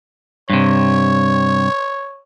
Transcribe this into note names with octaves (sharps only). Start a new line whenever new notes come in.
G2 C3 C#5